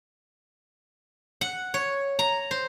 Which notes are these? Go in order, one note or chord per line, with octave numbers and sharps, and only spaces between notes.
F#5
C#5
A#5
C5